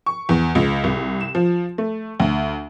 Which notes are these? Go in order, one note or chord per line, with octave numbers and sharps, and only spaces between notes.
C#6
E2
C#2
C2
E7
F3
A3
D2